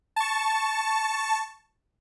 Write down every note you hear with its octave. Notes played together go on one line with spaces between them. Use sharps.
A5 C#6